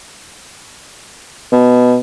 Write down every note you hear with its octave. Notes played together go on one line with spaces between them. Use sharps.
B2